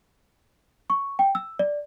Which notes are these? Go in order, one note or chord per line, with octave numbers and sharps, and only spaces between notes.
C#6
G5
E6
D5